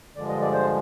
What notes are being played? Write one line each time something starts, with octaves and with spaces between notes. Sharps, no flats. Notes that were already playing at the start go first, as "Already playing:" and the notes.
G2 D3 F3 G#3 D5
D#5
D5
C5